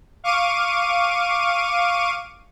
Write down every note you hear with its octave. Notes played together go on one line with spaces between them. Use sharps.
F5 C#6 D6 D#7